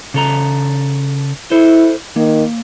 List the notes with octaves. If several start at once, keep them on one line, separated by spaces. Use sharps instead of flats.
C#3 A4 A#5
E4 A4 C5
D#3 A#3